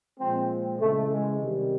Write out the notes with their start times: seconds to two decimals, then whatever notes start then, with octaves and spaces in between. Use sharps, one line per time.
0.18 A#2 F3 G#3 C4
0.79 C#3 E3 G#3 A3
1.09 G#3
1.40 C3 D#3 G3